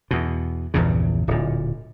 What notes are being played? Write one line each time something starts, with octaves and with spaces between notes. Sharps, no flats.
E2 B2
A#1 E2 G2 C#3
D1 A#2